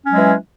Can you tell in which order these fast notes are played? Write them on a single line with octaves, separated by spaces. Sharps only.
C#4 F#3 G#3 E3